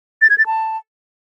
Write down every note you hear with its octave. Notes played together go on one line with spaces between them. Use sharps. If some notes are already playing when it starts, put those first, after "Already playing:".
A6
G#6
A6
A5